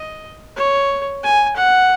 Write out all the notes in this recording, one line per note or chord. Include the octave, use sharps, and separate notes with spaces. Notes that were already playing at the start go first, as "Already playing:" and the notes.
Already playing: D#5
C#5
G#5
F#5